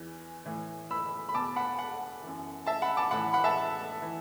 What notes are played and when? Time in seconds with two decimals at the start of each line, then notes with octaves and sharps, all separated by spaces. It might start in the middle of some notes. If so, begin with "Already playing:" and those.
Already playing: E2 E3
0.45 A2 E3
0.91 B5 E6
1.29 B5
1.34 E2 B2 A5 D6
1.56 F#5 B5
1.79 F#5
2.23 F#2 E3
2.66 E5 A5
2.82 F#5 B5
2.97 A5 D6
3.11 A2 E3 F#5 B5
3.33 F#5 B5
3.44 E5 A5
4.02 E3